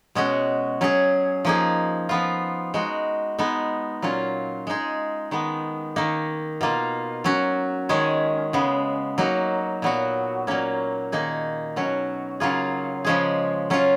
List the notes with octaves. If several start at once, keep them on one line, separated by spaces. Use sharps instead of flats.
B2 G#3 C#4 F#4
F#3 C#4 G#4
F3 A#3 D#4 G#4
F3 B3 F4
G#3 D#4 F#4
G#3 B3 D#4
A#2 F#3 C#4 F4
G#3 D#4 G#4
D#3 G#3 B3
D#3 A#3 D#4
B2 A#3 F4
F#3 C#4 F#4
D#3 G#3 C#4 G#4
C#3 G#3 B3
F#3 A#3 D#4 F#4
A#2 F#3 B3 F#4
A#2 F#3 A#3 C#4
D#3 A#3 D#4 G#4
B2 F#3 C#4 F#4
C#3 F#3 A#3 F4 G#4
C#3 F3 G#3 C#4 G#4
F#3 C#4 F4